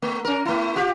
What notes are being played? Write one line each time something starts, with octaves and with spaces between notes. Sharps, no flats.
A3
C#4 A#4
A3 E4
F4 G4